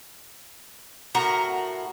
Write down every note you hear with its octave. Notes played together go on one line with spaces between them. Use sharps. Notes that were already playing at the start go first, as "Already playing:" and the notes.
A2 F#4 A#4 A#5